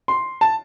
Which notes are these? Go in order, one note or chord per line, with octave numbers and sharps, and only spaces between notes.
C6
A5